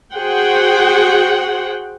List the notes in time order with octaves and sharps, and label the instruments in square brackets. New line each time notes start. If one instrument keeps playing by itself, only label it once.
[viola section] F#4 G#4 C5 F#5 G5